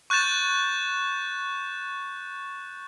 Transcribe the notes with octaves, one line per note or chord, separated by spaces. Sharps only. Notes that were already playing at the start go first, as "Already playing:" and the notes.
C#6 F#6 G6 A6 E7